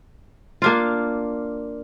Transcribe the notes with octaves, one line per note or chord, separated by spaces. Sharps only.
A#3 D4 F4